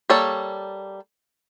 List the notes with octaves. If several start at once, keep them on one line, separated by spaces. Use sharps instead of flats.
G3 A#3 A4 C#5 D5